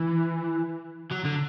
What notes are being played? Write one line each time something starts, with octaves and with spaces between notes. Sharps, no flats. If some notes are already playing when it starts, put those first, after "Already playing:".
Already playing: E3
F#3
D3